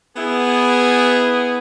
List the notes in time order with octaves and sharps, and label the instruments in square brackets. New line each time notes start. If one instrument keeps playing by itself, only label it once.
[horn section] B3 E4 G#4